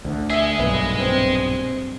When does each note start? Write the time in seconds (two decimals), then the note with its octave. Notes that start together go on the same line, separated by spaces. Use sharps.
0.05 D2 D3
0.30 G#4 D#5 E5
0.59 B1 G2 A#2 B3
1.00 C4